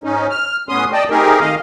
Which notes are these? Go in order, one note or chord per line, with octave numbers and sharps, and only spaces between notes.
G#2 C#4 D#4
F6
A2 B3 C#4 C6 D#6
D5 D#5 G5 A5
A3 C4 D#4 G4 G#4 A#4
D#3 D#5 F5